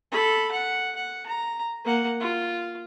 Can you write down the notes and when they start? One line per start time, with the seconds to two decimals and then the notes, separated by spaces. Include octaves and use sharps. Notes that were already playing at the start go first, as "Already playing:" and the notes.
0.12 A4 B5
0.52 F#5
0.96 F#5
1.26 A#5
1.85 A#3 F#5
2.20 F4